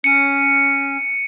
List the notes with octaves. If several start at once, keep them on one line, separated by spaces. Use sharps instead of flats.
C#4 C#7 D#7